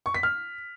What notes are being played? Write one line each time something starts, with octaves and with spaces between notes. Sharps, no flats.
C#6
B6
F6